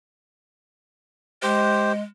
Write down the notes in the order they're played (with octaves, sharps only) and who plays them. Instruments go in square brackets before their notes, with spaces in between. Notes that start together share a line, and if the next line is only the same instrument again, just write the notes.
[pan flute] G#3 [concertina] G4 C5